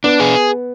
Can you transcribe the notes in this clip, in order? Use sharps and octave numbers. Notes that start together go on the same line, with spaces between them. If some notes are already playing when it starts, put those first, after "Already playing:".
B3 D4
G#4